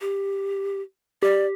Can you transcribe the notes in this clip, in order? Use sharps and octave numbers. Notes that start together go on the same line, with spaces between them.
G4
G4 D5